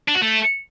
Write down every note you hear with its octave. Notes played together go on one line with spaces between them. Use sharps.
D4
F#4
A3